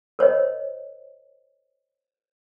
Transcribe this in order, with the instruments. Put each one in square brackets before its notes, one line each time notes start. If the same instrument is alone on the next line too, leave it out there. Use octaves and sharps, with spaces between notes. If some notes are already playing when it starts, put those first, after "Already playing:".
[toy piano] A#4 C5 C#5 D#5